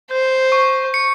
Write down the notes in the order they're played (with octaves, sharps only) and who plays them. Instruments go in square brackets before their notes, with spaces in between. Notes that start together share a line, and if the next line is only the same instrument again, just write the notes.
[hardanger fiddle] C5 [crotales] G6
[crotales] C#6
C#7